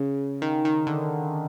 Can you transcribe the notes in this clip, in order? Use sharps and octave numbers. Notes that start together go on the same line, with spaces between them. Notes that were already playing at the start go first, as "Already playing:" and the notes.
Already playing: C#3
D#3
D#3
D3